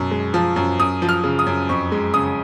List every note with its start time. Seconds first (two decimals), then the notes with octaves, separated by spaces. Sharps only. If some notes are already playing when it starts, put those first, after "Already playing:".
Already playing: F#2 B2
0.11 G#3
0.34 F3
0.56 F#2
0.79 F#2 D#6
1.02 F3
1.09 F6
1.23 C#3
1.39 D#6
1.46 F#2
1.69 F2 C#6
1.92 G#3
2.14 C#3 D#6